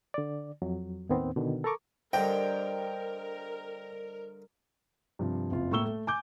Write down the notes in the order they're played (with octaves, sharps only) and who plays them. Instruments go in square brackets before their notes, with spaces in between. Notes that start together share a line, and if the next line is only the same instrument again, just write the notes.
[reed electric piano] D3 D5
F2 F#3
D#2 A2 D#3 B3 C4
B2 D3 D#3
A4 A#4 A#5 C#6 D6
[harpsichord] G2 D3 A#5 [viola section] A#4 [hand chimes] C5 D5 D#5 [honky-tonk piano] G5
[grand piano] G2 C3 F3
F#1 F2 F4
A2 A#3 C#6 E6 G7
A3
G#5 D6 G6